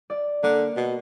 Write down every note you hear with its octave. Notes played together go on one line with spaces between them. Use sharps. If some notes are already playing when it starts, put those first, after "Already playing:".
D5
D3 A#3
B2